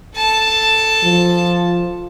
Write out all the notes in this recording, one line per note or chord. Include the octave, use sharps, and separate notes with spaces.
A4 A5
F3